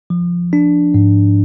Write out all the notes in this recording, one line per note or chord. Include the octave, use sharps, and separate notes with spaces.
F3
D4
G#2